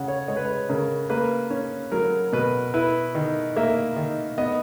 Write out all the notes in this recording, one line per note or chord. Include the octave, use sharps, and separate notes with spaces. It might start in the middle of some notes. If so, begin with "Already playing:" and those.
Already playing: C#3 C#4 F#5
C#5
G#3 C#5
B4
C#5
C#3 A#4
A#3 B4
C#4
F#3 A#4
B2 B4
E4 B4
D#3
A#3 E5
D#3
B3 D#5